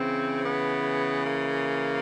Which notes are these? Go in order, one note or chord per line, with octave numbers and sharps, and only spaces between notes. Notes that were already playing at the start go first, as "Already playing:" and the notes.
Already playing: C#3 E3 C4
B3
A#3